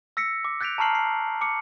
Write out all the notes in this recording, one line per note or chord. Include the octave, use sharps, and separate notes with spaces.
E6 A#6 B6 C#7
D6
F#6 G6 A6 B6 D7 F7
A5 A#5 C#6 F6 C7 F#7
C7
D6 C#7